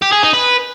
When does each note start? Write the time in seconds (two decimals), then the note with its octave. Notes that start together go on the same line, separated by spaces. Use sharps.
0.02 G4
0.13 G#4
0.23 D#4
0.34 B4